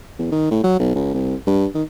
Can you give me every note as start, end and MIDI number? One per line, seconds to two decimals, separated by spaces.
0.19 0.30 40
0.32 0.48 51
0.51 0.61 45
0.64 0.76 54
0.79 0.93 35
0.95 1.09 37
1.14 1.35 36
1.47 1.66 43
1.75 1.83 51